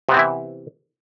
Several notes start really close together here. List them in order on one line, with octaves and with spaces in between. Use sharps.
C3 B3 C4 E3 E4